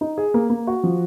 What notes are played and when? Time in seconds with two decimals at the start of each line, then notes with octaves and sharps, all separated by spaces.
0.01 D#4
0.18 G#4
0.34 A#3
0.50 A#3
0.67 F#4
0.84 F3